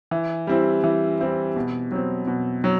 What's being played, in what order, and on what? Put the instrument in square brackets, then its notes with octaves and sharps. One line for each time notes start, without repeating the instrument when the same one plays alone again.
[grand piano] E3
G3 C4 E4
E3
G3 C4 E4
B2
F#3 C4
B2
F#3